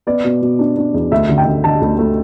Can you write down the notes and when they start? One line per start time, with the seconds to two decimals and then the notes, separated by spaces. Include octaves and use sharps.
0.07 B3 D5
0.24 B2
0.42 B2
0.59 D4
0.77 D4
0.94 E2
1.11 D2 E5
1.29 D3
1.38 G5
1.46 D3
1.64 D3 A5
1.81 D2
1.99 A3